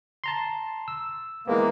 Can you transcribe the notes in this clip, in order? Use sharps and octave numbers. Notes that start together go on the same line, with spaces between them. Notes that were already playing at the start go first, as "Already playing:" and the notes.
A5 A#5 C6
E6
E3 G#3 A#3 B3